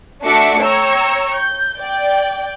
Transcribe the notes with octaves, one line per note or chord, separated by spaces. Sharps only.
A3 D4 F#4 E5 D6 C#7
C#5 G5 A#5 C#6 E6
G6
D5 G5